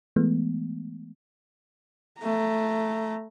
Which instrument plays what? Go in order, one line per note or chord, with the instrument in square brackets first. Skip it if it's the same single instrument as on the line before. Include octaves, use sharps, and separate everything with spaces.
[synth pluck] E3 G#3 A3 B3
[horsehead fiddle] A3 A#5